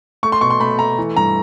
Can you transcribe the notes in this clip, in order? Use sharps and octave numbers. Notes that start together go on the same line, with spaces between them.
A3 C#6
C6
B2 C#6
C6
A3 B5
A3 A#5
E3
G2 A#5